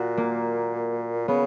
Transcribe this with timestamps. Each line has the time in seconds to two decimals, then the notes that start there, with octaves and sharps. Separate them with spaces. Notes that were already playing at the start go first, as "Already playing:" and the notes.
Already playing: A#2 F#4
0.17 A#3
1.28 C#3 B3